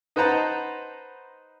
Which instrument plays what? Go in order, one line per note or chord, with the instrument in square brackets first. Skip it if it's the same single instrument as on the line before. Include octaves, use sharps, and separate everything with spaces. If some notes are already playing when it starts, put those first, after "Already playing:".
[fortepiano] D#4 B4 C5 F#5 A5 A#5